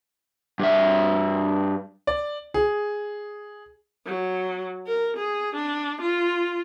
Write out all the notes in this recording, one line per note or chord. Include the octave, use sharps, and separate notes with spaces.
G2 E5
D5
G#4
F#3
A#4
G#4
D4
F4